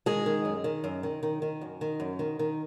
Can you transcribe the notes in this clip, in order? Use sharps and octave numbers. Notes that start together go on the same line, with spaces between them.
D#3 G#3 G#4
D#3
F#2
D#3
F#2
D#3
D#3
D#3
F#2
D#3
F#2
D#3
D#3